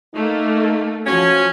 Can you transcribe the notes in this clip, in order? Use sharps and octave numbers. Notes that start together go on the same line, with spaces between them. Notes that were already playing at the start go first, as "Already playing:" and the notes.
A3 A#3 D#4
F3 C#4 F#4